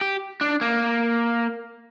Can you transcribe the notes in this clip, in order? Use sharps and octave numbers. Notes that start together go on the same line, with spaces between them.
G4
D4
A#3